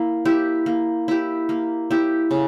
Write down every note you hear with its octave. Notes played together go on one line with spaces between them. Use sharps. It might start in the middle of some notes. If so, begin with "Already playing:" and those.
Already playing: A#3 E4
E4 G4
A#3
E4 G4
A#3
E4 G4
C#3